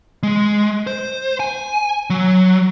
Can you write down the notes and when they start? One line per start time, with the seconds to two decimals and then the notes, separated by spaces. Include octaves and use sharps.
0.23 G#3
0.87 C5
1.40 G#5
2.10 F#3